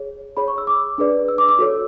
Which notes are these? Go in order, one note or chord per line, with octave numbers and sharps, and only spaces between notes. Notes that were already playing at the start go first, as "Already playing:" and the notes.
Already playing: G#4 C#5
G#4 C#5 B5
C#6
E6
D6
D4 G#4 B4 D5
E6
D6
D6
F#4 A4 C#5 E6